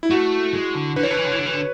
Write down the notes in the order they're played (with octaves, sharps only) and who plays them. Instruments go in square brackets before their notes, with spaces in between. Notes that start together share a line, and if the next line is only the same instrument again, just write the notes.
[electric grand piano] E4
[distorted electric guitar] A3 [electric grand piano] F#4
[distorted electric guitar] G#3
D3
[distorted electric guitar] D3 [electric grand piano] B4
[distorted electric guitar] E3 [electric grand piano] C#5
[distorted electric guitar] D3 [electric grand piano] B4
[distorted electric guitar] E3
D3
E3
D3
E3
D3